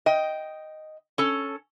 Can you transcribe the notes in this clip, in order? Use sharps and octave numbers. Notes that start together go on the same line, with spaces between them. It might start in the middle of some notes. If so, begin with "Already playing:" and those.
D#5 G5
C#4 A4